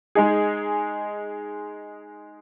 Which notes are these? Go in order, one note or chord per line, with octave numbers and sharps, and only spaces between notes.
G#3 D#4 G#4